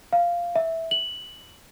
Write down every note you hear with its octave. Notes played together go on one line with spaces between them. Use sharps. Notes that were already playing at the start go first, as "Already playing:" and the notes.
F5
E5
F#7